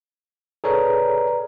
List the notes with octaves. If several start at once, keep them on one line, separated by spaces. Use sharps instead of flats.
G#4 A4 B4 C#5 D5 A#5